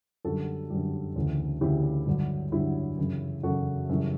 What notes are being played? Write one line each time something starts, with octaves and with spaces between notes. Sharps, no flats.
F#2 D3 G3 F#4 A4
F#2 D3 G3
D2 C#3 E3
D2 C#3 E3 E4 G4
G2 D3 F#3
G2 D3 F#3 E4 G4
F#2 C#3 E3
F#2 C#3 E3 F#4 A4
F#2 C#3 E3 G3